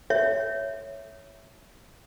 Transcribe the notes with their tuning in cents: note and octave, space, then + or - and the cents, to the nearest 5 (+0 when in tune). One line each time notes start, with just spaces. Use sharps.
C#5 +0 E5 +0